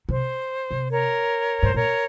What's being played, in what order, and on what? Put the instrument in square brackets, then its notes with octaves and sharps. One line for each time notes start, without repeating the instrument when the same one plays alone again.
[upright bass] C3 [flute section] C5
[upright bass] C3
[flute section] A#4 C#5
[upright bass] G#2 [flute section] C5
[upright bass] A#2 [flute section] A#4 C#5